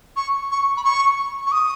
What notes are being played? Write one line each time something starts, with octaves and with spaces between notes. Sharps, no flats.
C#6
C#6
B5
C#6
C#6
D#6